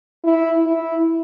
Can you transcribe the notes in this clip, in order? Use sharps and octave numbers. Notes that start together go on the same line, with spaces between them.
E4
E4